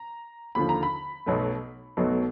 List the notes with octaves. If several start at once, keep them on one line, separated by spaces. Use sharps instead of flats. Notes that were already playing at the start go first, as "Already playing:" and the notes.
Already playing: A#5
D#2 D3 F3 B5
A#5
B5
B1 B2 F#3 A3
B1 B2 F#3 A3